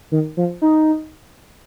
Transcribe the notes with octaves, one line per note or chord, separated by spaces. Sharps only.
D#3
F3
D#4